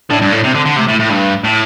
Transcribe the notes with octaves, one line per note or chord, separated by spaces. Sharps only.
A2 D4
G2
A2
C3 C4
D3
D3
C3 A3
A2
A2
G2
A2